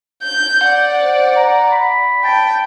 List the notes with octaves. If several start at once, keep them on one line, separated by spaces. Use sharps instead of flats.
G6
D5 F#5
C5
A#5
B5
G5 A5